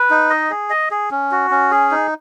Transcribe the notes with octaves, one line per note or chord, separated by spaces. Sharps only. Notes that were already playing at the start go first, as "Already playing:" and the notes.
Already playing: B4
D#4
D#5
G#4
D#5
G#4
C#4
F#4
C#4
G#4
D#4